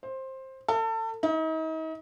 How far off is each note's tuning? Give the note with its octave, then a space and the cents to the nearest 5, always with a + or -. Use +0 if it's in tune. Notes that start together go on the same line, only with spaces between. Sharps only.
C5 +15
A4 +30
D#4 +40